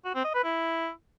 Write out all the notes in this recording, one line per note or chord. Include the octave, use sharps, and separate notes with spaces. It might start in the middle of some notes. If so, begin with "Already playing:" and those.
F#4
C4
D#5
B4
E4